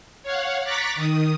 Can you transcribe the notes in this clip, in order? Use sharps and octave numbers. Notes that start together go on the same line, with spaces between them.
C#5 F5 F#5
A#5 C#6 D6 F#6 A6 B6
D#3 D#6